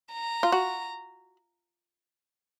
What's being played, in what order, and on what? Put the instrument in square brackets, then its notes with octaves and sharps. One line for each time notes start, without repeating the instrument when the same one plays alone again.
[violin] A#5
[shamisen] F4
F#4